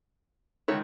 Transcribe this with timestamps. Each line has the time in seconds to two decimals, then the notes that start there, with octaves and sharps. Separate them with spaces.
0.68 C#2 D#3 F#4 C#5 E5